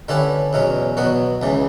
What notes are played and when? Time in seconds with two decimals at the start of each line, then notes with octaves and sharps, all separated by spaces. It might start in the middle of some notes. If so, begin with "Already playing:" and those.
0.08 D3 G3 C#4 E4 B4
0.53 E2 B2 F#3 C#4
0.97 B2 F#3 B3 F#4
1.42 C#2 C#3 E3